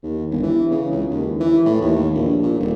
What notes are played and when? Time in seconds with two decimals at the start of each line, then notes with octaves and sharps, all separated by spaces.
0.03 D#2
0.31 G1
0.43 E3
0.71 C#3
0.91 C#2
1.11 D#2
1.40 E3
1.65 A2
1.81 D#2
2.15 A#1
2.42 A#2
2.60 D#1